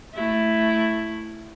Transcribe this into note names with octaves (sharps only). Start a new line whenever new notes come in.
A3 E4